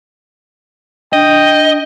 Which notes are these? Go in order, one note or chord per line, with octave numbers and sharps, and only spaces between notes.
D4 D#5 G5